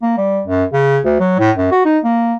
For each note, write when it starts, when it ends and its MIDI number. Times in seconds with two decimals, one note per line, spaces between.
0.02 0.14 58
0.18 0.42 55
0.47 0.64 42
0.73 0.99 49
1.05 1.16 38
1.20 1.35 54
1.39 1.51 45
1.57 1.72 42
1.72 1.84 66
1.85 1.99 63
2.04 2.36 58